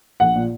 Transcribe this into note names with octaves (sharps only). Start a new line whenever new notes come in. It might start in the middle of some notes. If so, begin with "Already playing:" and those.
A#1 F#5
A#2